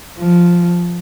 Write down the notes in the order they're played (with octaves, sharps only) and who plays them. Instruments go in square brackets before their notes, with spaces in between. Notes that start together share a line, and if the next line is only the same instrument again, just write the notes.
[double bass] F3